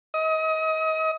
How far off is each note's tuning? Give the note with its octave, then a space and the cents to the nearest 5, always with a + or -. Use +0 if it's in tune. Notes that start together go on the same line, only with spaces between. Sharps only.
D#5 +30